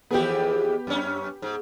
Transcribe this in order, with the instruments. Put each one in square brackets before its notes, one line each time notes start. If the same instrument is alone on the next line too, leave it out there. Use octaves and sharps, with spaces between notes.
[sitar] F2 E3 G#4 [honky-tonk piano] B3 G4
[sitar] F#2 C#4
G#2